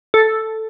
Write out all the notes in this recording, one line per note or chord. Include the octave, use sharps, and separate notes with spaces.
A4